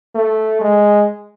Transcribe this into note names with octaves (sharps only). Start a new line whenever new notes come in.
A3
G#3